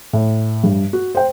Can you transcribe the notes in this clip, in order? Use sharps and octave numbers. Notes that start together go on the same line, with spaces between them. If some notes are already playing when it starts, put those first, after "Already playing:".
A2
G2
F#4
C5 G5